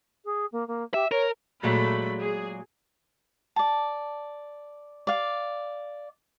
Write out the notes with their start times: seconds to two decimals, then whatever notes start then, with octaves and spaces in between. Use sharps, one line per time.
0.25 G#4
0.52 A#3
0.68 A#3
0.94 G4 E5
1.11 A#4 C#5
1.63 A#2 F#3 G#3 A3 B5
2.21 G#4
3.56 D5 A5
5.07 D5 F5